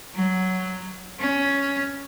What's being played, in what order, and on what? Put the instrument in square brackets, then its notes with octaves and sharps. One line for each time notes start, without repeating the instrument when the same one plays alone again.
[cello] F#3
C#4